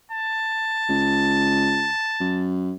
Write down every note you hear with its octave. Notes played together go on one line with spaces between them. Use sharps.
A5
C#2
F#2